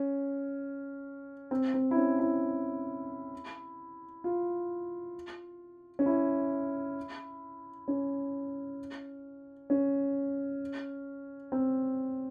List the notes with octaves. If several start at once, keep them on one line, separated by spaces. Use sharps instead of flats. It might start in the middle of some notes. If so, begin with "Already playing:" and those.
Already playing: C#4
C4
C4
E4
C#4
E4
F4
C#4
E4
C#4
C#4
C4